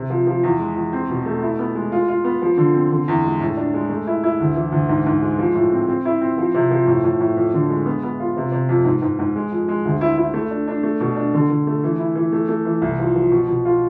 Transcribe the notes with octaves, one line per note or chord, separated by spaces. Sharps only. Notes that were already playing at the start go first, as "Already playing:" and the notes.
Already playing: C3
F3
F3
E2
G#3
E2
C4
B2
A3
E4
B3
G#3
F4
F4
B3
F3
D3
C4
D3
E2
G#3
A2
D4
G#3
A3
E4
E4
D2
E3
D2
G#2
G#2
G#3
F3
A2
C4
C4
E4
C4
F3
C3
F3
A2
A2
A2
F2
D3
G#3
B3
B3
F4
C3
C3
F2
G#2
G#2
G#2
G#3
F2
G#3
D2
E4
E4
A3
D4
D4
A3
B2
D4
D3
D3
A3
E3
E4
E3
A3
A3
E3
C2
F3
F3
B2
B2
F4